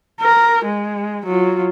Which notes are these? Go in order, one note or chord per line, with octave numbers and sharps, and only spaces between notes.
A#4
G#3
F#3 F4